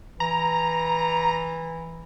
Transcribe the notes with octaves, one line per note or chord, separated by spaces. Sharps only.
E3 A#5